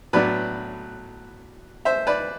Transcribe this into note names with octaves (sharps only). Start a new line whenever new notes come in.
A2 F#3 B3 D4 B4 D5
C5 E5
B4 D5